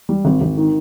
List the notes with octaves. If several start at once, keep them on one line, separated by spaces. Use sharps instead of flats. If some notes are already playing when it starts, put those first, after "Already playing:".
G3
G#1
G#1
D#3